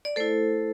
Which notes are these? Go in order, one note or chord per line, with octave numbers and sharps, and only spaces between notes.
D5
A3 E4 A4 C5